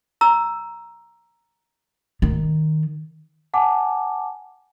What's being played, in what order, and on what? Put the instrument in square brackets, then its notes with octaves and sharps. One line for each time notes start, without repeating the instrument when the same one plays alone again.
[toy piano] A#5 E6
[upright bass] D#3
[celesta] F#5 G#5 A5 D6